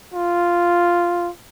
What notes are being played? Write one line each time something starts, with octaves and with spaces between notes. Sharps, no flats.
F4